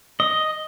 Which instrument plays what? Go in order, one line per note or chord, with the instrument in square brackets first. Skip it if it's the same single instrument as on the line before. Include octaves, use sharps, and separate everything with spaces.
[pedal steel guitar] D#5